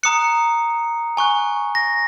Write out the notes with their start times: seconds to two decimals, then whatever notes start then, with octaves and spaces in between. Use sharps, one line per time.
0.03 A#5 D#6 F#6 C#7
1.17 G#5 C#6 F#6
1.75 A#6